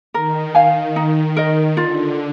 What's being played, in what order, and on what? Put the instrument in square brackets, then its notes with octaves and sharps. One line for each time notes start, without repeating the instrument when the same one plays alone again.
[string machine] D#3 [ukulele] A#4
[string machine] D#3 [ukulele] F5 G#5
[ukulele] D#4
A#4 D#5
[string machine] D3 [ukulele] F4